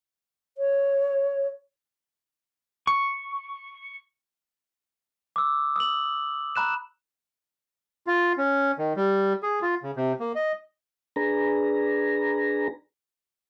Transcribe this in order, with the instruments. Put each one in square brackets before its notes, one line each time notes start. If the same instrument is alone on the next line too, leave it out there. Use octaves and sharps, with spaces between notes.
[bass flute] C#5
[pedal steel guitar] C#6
[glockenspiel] D6 E6
D#6 E6 F#7
A#5 B5 F#6 E7
[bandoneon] F4
C#4
D#3
G3
G#4
F4
C#3
C3
A#3
D#5
[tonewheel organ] D4 G#4 B4 A#5